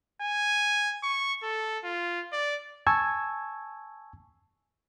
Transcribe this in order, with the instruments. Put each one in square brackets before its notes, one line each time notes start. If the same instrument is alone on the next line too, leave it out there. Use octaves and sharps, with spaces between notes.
[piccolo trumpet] G#5
C#6
A4
F4
D5
[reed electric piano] G#5 A5 C#6 E6 G#6